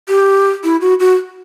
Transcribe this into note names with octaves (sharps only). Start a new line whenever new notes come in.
G4
E4
F#4
F#4